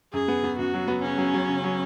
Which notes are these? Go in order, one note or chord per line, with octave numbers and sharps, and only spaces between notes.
F#2 G#4
B3
B3
F#2 F#4
F#3
B3
C#3 C#4
F#3
F#3
C#3
F#3